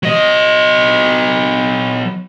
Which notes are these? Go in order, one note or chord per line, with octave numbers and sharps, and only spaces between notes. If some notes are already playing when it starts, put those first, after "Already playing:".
F#3 D#5